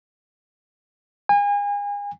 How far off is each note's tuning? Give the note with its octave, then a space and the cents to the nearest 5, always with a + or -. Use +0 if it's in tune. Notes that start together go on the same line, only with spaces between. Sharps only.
G#5 -35